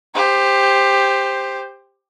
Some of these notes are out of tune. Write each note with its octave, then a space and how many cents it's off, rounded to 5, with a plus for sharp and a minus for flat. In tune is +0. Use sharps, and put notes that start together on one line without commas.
G4 +15 C5 +0